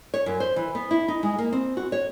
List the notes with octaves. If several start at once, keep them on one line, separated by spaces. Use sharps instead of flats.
C#5
F#2
C5
E3
B3
E4
D#4
G#3
A#3
C4
F#4
C#5